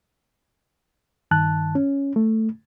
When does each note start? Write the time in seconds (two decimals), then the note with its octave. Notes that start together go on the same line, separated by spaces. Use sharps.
1.31 G2 D#3 A5 F#6
1.75 C#4
2.16 A3